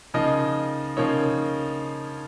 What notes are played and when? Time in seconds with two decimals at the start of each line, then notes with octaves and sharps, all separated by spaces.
0.14 C#3 F3 A#3 D#4 D#5
0.97 C#3 F3 A#3 D#4 C#5